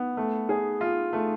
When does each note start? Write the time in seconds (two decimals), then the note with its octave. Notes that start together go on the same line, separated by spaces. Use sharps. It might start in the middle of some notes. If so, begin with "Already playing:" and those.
Already playing: B3
0.17 A3
0.49 G#4
0.81 F4
1.13 A3